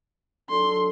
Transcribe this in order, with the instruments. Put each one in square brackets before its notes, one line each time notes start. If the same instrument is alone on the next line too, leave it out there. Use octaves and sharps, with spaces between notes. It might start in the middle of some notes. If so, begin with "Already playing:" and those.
[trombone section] F#3 D4 A4 [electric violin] C6